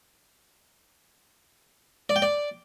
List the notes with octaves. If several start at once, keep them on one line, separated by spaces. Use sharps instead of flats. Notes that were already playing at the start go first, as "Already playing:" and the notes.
D5
G5
D5